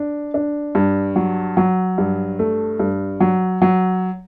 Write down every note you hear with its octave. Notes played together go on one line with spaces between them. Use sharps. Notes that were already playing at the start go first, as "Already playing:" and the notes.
Already playing: D4
D4
G2
F#3
F#3
G2
A3
G2
F#3
F#3